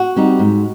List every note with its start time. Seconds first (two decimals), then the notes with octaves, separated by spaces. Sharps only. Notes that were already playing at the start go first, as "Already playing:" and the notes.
Already playing: F#4
0.16 G3 C4 D#4
0.39 G#2